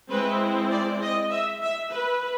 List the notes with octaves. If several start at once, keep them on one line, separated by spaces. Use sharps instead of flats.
G#3 C4 E4 B4
D5
D#5
E5
E5
B4